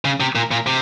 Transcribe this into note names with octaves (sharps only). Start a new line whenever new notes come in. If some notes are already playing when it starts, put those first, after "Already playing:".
C#3
C3
A#2
A#2
C3